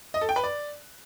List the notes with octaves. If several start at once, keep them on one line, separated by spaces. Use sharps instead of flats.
D#5
A4
G5
B4
D5